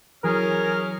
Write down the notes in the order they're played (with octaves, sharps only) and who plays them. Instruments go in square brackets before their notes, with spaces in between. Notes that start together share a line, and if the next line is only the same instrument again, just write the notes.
[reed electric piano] E3 F#3 [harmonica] C#4 F6 [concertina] G#4 [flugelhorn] A#4